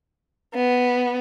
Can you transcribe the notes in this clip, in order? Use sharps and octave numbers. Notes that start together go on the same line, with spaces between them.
B3